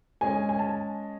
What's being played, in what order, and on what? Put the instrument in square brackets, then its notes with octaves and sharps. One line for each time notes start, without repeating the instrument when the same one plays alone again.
[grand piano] G#3 C#4 G#4 [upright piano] G#5
[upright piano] G#5
A5